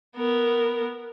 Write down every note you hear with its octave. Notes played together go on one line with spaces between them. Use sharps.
B3 A#4